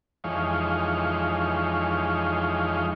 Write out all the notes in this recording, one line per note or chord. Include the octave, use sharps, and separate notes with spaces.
F2 E3 G#3 D#4 C#5 F5